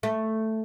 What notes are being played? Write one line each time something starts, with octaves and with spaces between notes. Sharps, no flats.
A3